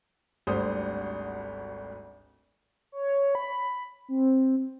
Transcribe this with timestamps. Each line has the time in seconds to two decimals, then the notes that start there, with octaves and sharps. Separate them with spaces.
0.47 G#1 D2 G3 C5 D#6 G6
2.92 C#5
3.35 B5
4.09 C4